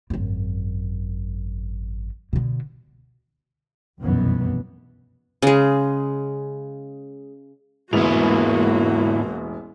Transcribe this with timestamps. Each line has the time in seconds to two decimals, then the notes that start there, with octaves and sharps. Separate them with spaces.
0.10 G#1 F#2
2.33 B2 D3
4.01 F1 C2 F#2 B2 E3 B3
5.42 C#3 G#3
7.93 E1 A1 G#2 A#3 B3 E4 F#4 F7